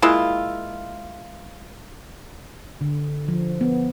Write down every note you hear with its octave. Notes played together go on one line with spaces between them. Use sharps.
G#3 A#3 E4 F4
D3
F3
B3